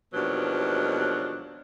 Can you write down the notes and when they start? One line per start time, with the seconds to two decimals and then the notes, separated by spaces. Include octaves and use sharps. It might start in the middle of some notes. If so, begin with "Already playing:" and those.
0.14 D#2 B2 F3 F#3 G#3 D4